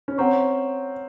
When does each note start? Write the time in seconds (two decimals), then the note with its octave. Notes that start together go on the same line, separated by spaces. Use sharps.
0.08 C#4
0.18 C4 C#5 F#5 A#5 C#6